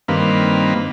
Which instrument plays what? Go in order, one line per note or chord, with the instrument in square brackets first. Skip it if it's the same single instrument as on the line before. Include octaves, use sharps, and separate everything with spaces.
[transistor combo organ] G2 D#3 A#3 C4 B4 F5